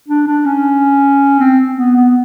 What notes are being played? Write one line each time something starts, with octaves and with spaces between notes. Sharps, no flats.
D4
D4
C#4
C4
B3
B3